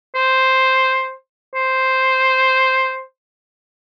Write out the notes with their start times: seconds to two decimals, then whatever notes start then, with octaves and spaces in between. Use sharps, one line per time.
0.15 C5
1.54 C5